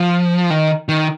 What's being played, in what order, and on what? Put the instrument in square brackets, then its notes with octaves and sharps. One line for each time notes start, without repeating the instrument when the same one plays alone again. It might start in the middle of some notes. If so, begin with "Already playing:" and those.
Already playing: [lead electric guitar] F3
D#3
D#3